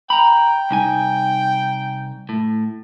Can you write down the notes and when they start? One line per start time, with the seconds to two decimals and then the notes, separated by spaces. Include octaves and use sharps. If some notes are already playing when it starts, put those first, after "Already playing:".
0.10 G5 A#5 B5
0.71 C2 D#4 G#5
2.29 A2